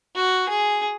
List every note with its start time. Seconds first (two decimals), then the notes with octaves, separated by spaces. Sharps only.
0.15 F#4
0.49 G#4